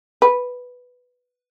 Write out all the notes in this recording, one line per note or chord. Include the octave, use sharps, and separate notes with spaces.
B4